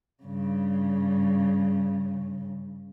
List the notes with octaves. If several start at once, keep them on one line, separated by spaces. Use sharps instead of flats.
G2 C#3